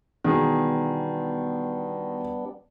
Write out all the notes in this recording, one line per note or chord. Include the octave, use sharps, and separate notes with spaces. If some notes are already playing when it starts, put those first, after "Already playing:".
B2 D#3 E3 G3 B3 D4 G#4